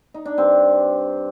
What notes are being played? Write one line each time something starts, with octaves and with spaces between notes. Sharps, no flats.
D#4
D4
G2 C4